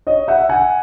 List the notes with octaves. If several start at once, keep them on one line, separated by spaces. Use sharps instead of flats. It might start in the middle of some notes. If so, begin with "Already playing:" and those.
C#5 D#5
E5 F#5
F#5 G#5